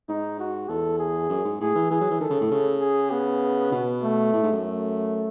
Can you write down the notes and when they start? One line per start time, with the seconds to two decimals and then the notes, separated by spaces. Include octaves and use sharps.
0.09 G#2 D#4
0.39 F#4
0.69 E2 A4
0.99 G#4
1.30 F#2
1.45 G#2
1.60 A2 G#4
1.75 E3
1.91 E3 G#4
2.01 F#3
2.11 E3
2.21 D#3 A4
2.31 C#3
2.41 A2
2.52 C#3
2.81 G#4
3.12 B3
3.72 B2
4.03 A3
4.33 A2
4.43 G#2
4.53 F#2
4.63 A3